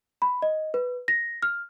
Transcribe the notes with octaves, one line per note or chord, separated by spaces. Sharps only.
B5
D#5
B4
A#6
F6